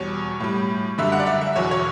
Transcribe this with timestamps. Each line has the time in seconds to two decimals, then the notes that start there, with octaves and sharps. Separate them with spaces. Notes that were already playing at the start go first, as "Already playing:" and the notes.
Already playing: E2 B2 G3 C#5
0.40 A2 G3
0.98 F#2 D3 G3 E5
1.12 F#5
1.20 D5
1.27 E5
1.41 E5
1.56 E2 B2 F#3 C#5
1.71 C#5